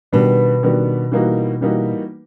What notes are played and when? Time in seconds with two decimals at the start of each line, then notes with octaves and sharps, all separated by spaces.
0.12 B2 D#3 G3 B3 D4 F#4
0.63 D#3 G3 B3 D4 F#4
1.12 E3 G3 A#3 D#4 F#4
1.61 E3 G3 A#3 D#4 F#4